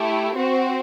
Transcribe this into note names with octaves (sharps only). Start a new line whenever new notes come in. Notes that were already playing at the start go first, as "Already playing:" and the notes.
Already playing: A3 E4 G4
C4 F#4 C5